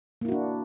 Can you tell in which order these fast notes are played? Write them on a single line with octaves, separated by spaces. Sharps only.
A#3 E4 F#4 D4